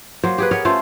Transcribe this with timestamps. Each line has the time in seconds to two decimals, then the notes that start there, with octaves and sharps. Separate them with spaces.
0.24 F#3 A#3 C5
0.38 G4 G#4 B4
0.51 B3 A#4 C#5
0.65 A3 C#4 F4 C5